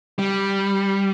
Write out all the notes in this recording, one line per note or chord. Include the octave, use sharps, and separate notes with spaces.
G3